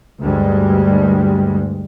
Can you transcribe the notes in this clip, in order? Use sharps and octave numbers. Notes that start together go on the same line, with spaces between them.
D2 G2 G3 G#3